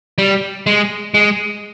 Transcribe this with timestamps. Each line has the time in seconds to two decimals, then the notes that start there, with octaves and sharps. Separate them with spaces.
0.18 G3
0.66 G#3
1.14 G#3